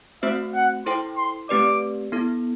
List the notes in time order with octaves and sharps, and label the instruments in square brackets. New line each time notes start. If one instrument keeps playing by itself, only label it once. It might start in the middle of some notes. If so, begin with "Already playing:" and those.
[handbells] A3 C4 F#4 C5 [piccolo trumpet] E5
[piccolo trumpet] F#5
[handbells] E4 A4 C5 G5 [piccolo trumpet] C6
[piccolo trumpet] C6
[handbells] A3 C4 G4 B4 D5 [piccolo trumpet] D6
[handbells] B3 E4 A4